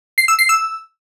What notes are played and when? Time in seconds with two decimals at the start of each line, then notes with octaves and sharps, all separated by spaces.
0.18 C7
0.28 E6
0.39 C7
0.49 E6